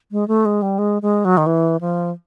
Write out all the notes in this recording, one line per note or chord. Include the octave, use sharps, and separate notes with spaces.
G#3
A3
G#3
G3
G#3
G#3
F#3
D#3
E3
F3